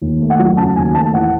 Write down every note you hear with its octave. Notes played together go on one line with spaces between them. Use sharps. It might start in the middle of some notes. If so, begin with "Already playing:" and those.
D#2
A3
F#5
F#3
C#3 A5
D#2 G#5
A3 A5
A1 F#5